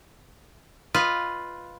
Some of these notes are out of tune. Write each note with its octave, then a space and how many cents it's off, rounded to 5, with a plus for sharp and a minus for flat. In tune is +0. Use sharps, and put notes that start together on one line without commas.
F4 +5 B4 +0 D#5 +0